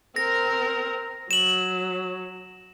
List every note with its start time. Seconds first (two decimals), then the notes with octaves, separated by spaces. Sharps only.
0.16 C4 A#4 A#6
1.31 F#3 E7 F#7